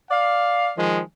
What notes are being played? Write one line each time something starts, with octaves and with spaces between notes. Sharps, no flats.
D5 F5
D#3 F3 G#3